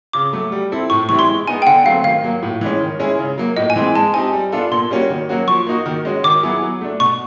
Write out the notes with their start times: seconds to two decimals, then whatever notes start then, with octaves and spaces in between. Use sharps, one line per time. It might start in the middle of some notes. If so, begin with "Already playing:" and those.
0.13 C#3 D6
0.33 F#3 A3
0.52 G3
0.72 C4 E4 A4
0.90 A2 C#6
1.09 E3 G3 C4 E4 C#6
1.19 C6
1.29 G#3
1.48 B3 D#4 G#4 G#5
1.62 G5
1.67 D3 F#5
1.86 F#3 A3 C4 F5
2.04 D#3 F5
2.24 F#3 A#3
2.42 A2
2.61 E3 G#3 C#4
2.80 D#3
2.99 G#3 C#4 E4 G#4
3.18 C#3
3.38 F#3 A#3
3.57 A2 D#5
3.70 G#5
3.76 E3 G#3 C4
3.95 G#3 A5
4.14 C4 D#4 G4 G#5
4.33 G3
4.52 B3 D4 F4 A4
4.72 A#2 C6
4.91 G3 A#3 C#4 F#4
5.10 D#3
5.29 F#3 A#3 C#4 F#4
5.47 F3 C#6
5.67 A#3 D#4 F#4
5.86 D#3
6.05 G#3 C#4 F#4
6.24 D#3 D6
6.43 F#3 B3 E4 G#4
6.62 F#3
6.81 A3 D4
7.00 B2 C#6